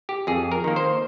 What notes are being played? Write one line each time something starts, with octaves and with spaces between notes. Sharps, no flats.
G4
F2 G#4
A#4
D#3 A#3
C5